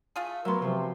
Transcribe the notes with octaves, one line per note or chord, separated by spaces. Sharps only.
A3 F4 G#4
F#3 B3 A#4 E5 C6
C3 F3